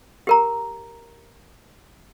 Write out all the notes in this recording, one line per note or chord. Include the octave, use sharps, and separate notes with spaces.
G4 A#4 A#5